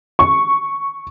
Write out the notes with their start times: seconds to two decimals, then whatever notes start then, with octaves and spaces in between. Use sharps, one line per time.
0.19 C#6